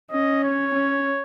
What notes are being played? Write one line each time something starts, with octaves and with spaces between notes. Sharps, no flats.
C#4 D#5
C#5
C#4